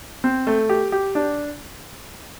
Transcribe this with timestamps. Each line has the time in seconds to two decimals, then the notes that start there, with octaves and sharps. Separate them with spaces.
0.24 C4
0.47 A3
0.69 G4
0.92 G4
1.15 D4